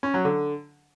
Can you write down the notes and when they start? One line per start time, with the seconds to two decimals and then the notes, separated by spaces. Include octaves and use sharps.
0.03 C#4
0.14 F#3
0.25 D3